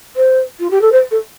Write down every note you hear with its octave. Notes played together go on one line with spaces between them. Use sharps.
C5
F4
G4
A4
C5
A4